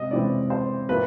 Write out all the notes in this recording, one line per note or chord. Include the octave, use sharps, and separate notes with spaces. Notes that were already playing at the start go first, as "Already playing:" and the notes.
Already playing: C3 G#3 D#5
C3 E3 G#3 C4 D5
C5
A2 F3 A#3 B4